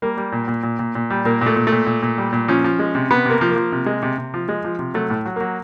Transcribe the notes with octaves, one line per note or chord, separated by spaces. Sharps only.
G3 A#3
G3
A#2
A#2
A#2
A#2
A#2
G3
A#2 A#3
A#2
A3
A#2
A3
A#2
A#2
A#2
G3
A#2
F3 C#4
F3
G#3
C3
C3 B3
C3 A#3
F3
A#3
F3
C3
G#3
C3
C3
F3
G#3
F3
C3
F#3 A3
A2
F#3
F#3 A#3